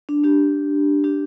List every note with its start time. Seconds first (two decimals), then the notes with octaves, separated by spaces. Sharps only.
0.09 D4
0.24 D4 G4
1.04 D4 G4